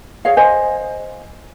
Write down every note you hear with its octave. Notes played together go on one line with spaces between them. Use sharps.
G#4 C#5 D#5 F5
C5 D#5 G#5